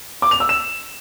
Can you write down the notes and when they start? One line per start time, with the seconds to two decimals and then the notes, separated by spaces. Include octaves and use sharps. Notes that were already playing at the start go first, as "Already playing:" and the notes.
0.22 D6
0.31 F7
0.40 E6
0.49 E7